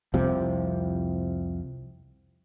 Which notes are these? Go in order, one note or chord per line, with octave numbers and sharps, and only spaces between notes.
C2 F2 C3 F3